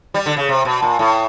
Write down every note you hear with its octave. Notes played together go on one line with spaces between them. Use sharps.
G3
D3
C#3
C3
B2
A#2
A2